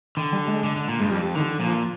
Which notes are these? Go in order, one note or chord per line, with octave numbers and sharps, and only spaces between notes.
D3 D#3
G3
G#3
D3
D3
A#2
G2 G#3
F2 G3
D3 D#3
A#2 F3